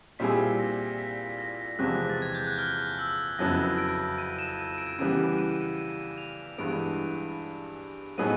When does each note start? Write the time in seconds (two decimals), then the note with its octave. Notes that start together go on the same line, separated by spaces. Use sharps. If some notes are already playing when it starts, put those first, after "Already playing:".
0.19 A#2 G3 C4 E4 G#4 B6
0.59 A#6
0.99 B6
1.38 A#6
1.79 E2 C3 F3 G#3 C4 F#6
2.10 A6
2.22 G#6
2.35 G6
2.47 F#6
2.58 F6
2.99 E6
3.38 F2 C#3 F#3 B3 E4 A#6
3.78 D7
4.18 D#7
4.39 E7
4.58 D#7
4.78 D7
4.98 C#3 E3 G3 B3 D7
5.38 D#7
5.78 D#7
6.18 F7
6.58 G2 E3 G#3 B3 D7
8.18 A2 F#3 B3 D#4 G#4 D#7